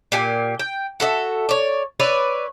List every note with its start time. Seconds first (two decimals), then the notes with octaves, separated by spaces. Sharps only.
0.12 A#2 G4 G#5
0.59 G5
1.00 F#4 A4 D#5 E5
1.49 C#5 D5
2.00 B4 C#5 D5 E5